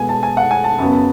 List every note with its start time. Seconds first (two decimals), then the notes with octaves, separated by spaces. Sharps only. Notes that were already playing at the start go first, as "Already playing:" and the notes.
Already playing: B2 G#3 B3 G#5
0.09 A5
0.23 G#5
0.37 F#5
0.51 G#5
0.64 A5
0.79 F#2 C#3 F#3 B3